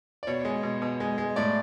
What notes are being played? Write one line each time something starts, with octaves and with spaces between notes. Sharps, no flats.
D5
B2 C#5
G#3
B2
B2
G#3
G#3
A2 D5